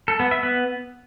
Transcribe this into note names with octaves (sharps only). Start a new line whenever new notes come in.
A4
B3
E5
B3